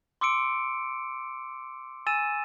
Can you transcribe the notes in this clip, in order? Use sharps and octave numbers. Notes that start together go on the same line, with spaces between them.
C6 D6 E6 C#7 D7
G#5 E6 A6 D#7 E7